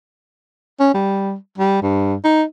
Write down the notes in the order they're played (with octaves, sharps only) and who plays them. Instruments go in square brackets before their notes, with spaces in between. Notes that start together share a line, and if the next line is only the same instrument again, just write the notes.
[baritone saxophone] C#4
G3
G3
G2
D#4